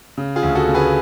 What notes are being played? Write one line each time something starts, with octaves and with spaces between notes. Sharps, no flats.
C#3
F4 G#4
D2
F#4 A4
C#3
G#4 B4